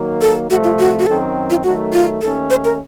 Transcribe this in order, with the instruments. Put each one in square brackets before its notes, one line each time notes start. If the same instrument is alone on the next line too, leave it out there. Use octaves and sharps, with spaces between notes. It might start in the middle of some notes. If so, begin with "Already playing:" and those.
Already playing: [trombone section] D#3 F#3 A#3
[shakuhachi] A4
[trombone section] C2 C3 F3 A3 [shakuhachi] F#4
[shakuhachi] F4
F#4
F#4
[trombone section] F#2 D#3 F#3 C4 [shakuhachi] A4
[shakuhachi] F4
[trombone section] D#3 F#3 A3 [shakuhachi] F#4
[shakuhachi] F4
[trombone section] D#2 D#3 A3 C#4 [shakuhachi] A4
[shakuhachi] C5
A#4